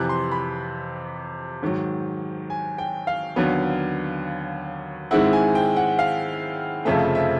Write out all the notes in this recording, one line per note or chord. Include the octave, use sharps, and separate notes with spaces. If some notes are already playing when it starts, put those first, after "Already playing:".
Already playing: F2 C3 E3 F#6
C6
B5
G#2 D#3 F#3
G#5
G5
F5
D#2 D3 F#3 B3
G#2 D#3 G#3 C4 E4 F#5
G#5
G5
F#5
F5
F1 F2 C#3 F3 A3 E5
E5